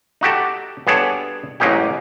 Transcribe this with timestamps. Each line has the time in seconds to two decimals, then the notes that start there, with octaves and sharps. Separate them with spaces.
0.21 D#4 F#4 G4 A4
0.87 G2 B3 G#4 A4 C#5 D5
1.60 A1 G#2 F#3 A#3 D#4 G4